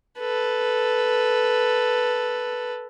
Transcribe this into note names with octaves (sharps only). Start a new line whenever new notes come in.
A4 B4